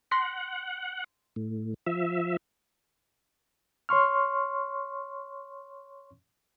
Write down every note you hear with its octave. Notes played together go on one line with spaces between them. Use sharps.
F#5 C6 A#6 B6
A2
F3 E5
C#5 C6 C#6 F6